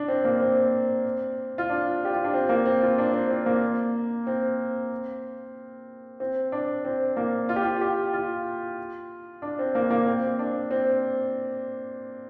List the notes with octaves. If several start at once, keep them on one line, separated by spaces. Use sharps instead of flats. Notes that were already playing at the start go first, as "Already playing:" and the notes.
Already playing: D4
C4
A#3
C4
F4
D4
G4
F4
D4
C4
A#3
C4
F4
D4
C4
C4
A#3
C4
C4
D4
C4
A#3
F4
G4
F4
G4
F4
D4
C4
A#3
A#3
C4
D4
C4